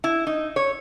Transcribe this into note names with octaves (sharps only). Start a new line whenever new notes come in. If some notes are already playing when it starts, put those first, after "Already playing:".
E4
D#4
C#5